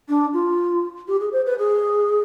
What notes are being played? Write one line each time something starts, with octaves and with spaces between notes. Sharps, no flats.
D4
F4
G4
G#4
C5
B4
G#4